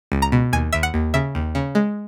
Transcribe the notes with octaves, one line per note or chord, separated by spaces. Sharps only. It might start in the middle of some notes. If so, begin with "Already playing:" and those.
C#2
A#5
B2
D#2 G#5
D#2 E5
F#5
D#2
C#3 E5
D#2
C#3
G#3